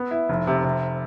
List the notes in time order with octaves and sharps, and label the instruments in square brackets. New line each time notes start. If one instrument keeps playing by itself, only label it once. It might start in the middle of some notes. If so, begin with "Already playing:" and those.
Already playing: [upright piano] B3
E4
F1
C3
C3